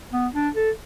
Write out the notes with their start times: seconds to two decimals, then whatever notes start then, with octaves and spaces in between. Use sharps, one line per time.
0.13 B3
0.34 D4
0.55 A4